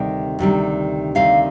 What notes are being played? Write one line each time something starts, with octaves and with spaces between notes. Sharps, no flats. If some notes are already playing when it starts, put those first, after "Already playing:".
Already playing: D2 C3 D#3 G3 G5
D2 C3 D#3 G3
D2 C3 D#3 G3 F5